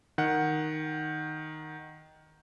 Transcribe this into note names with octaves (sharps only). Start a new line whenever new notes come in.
D#3 F#5